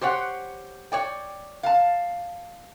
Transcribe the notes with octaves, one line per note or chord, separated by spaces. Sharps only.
G4 C5 C#5 F#5
C#5 D5 G5
F5 A5